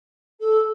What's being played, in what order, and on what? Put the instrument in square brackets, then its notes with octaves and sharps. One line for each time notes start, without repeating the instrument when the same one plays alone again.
[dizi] A4